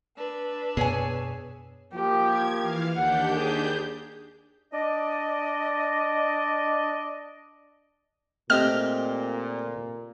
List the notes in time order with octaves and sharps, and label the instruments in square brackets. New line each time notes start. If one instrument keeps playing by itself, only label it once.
[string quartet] D4 B4 E6
[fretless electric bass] F#2 B2 B3 [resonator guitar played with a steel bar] G#4 C#5 G#5
[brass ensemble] F3 A#3 [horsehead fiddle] G4
[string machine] G#6
E3 F5
[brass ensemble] D#2 [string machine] D4 G4 G6 [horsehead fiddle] F#5
[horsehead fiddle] G#4
[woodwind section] D4 D5 D#5
[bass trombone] A#2 [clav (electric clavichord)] A3 D#5 [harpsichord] C4 G4 A#5 [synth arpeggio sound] F6